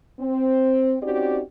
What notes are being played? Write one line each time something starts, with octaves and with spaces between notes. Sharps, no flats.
C4
C4 C#4 D#4 F#4 G4 D5